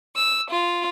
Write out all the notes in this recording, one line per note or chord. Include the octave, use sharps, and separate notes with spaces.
E6
F4